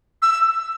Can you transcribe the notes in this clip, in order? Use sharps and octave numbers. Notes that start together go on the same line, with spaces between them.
E6